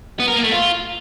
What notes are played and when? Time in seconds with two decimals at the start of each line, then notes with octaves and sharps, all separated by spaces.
0.20 B3
0.28 A#4
0.36 A#3
0.44 A3
0.52 F4